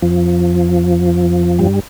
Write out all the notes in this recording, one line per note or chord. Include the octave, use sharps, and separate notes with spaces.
F2 F3
G2 G3